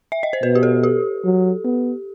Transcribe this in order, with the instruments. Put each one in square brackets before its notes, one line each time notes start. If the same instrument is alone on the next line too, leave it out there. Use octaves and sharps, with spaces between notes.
[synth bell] E5
D#5
C5
[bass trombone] B2 [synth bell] B4
[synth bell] G4
A4
G4
[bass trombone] F#3
B3